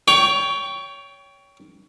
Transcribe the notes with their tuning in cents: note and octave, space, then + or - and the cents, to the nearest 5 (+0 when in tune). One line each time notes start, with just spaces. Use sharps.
C#5 +20 G5 +0 C#6 +40